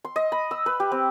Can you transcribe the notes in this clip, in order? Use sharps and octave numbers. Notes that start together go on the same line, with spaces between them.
C6
D#5
B5
E6
B4
G4
C4